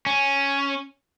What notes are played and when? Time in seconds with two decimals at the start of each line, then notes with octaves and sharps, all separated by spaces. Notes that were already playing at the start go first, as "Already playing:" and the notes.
0.06 C#4